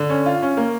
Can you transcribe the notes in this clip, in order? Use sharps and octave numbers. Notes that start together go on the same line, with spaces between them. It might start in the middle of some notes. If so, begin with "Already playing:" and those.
Already playing: D3
C#4
F4
C#4
A#3